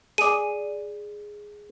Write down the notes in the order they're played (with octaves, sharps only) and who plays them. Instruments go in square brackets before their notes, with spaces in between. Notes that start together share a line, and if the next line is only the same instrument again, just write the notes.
[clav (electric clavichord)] G#4 D5 [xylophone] D#7